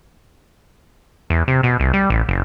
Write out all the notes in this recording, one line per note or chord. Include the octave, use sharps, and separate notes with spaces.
E2
C3
B2
C2
G3
A1
F#1